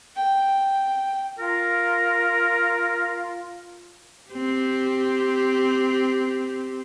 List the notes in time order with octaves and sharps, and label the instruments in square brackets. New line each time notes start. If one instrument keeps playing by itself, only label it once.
[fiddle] G5
[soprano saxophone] F4 [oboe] A#4
[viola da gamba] C4 G4